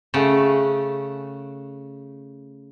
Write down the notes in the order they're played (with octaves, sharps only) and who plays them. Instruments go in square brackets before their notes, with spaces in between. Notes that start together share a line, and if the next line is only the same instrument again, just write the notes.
[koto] C#3 A3 F#5